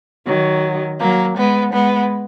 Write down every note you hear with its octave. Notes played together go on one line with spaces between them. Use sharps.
D#3 F#3
F#3 A#3
G#3 B3
G#3 B3